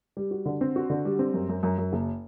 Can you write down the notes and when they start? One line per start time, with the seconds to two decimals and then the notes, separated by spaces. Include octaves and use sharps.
0.17 G3
0.31 F#4
0.46 D3
0.61 C4
0.76 F#4
0.90 D3
1.05 G3
1.19 C4
1.34 F#2
1.49 F#2
1.63 F#2
1.78 F#2
1.93 F#1